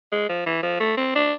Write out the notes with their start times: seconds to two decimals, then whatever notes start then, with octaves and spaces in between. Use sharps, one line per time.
0.12 G#3
0.29 F3
0.46 E3
0.63 F3
0.80 A3
0.97 C4
1.16 D4